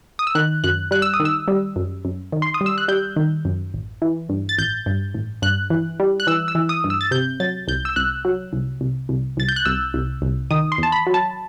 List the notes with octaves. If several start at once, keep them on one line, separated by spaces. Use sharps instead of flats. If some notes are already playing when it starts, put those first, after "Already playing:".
D#6
E6
D#3 F#6
F#2 F#6
G3 F#6
E6
D#6
D#3
E6
G3
F#2
F#2
D#3
C6
D#6
G3
E6
F#6
G3 G6
D#3
F#2
A1
E3
G2
A6
A1 G6
G2
A1
G2 F#6
E3
G3
F#6
E3 E6
E6
E3
D#6
G2
E6
A6
C3 G6
F#3 A6
C2 G6
E6
C2 F#6
F#3
C2
C2
C2
C2 A6
G6
F#6
C2 E6
C2
C2
D#3 D#6
C6
E2 A5
B5
F#3
A5